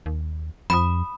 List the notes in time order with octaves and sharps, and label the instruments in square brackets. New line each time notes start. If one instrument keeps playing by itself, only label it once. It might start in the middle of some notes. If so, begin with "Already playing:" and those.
[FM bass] D#2
[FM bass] F2 [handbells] B5 D#6